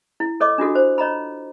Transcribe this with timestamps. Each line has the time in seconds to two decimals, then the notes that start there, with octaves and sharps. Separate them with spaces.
0.20 E4
0.40 A4 C#5 D#5 D6
0.58 D4 F4 F#4 A4
0.75 C5
0.98 C#5 D#5 A#5 B5